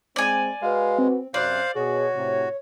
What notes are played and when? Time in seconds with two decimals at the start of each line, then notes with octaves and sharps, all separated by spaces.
0.16 G#3 C4 D5 G#5
0.62 G#3 F#4 B4 F5
0.99 C4
1.34 F#2 C3 C5 D5 F5 F#6
1.75 B2 F#4 G#4 C#5
2.15 A2 C3